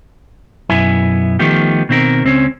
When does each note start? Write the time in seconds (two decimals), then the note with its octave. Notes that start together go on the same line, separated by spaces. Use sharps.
0.70 B1 F#2 B3 E4 E5 G#5
1.39 D#3 F3 A3 B3 G4
1.89 B2 D#3 C4 F4 A#4
2.24 C#2 C4 C#4